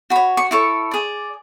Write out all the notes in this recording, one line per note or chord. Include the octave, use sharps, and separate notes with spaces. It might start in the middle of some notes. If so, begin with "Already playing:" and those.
F#4 B5
C#5
C#6
E4 A4 C#5 C#6
G#4 D5